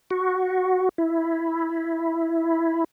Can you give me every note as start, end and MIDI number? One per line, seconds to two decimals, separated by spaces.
0.11 0.89 66
0.98 2.84 64